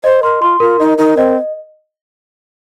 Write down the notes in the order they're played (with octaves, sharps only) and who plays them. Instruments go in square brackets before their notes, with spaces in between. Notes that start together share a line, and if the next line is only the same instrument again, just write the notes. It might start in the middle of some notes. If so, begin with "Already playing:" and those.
[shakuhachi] C5 [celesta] D#5
[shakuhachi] A#4 [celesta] C6
[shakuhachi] F4 [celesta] C6
[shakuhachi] F4 [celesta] A#4
[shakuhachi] D#4 [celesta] D#5
[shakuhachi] D#4 [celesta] A#4
[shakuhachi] C4 [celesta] D#5